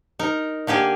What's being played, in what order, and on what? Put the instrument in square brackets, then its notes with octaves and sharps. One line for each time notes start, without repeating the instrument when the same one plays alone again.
[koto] D#4 A#4
D3 A#3 G4 G#4